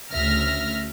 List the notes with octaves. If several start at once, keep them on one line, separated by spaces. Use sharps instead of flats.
D2 C#3 E5 F6 A#6